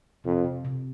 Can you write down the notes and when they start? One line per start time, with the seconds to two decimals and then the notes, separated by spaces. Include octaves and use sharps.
0.24 F2 C3
0.44 C3
0.65 C3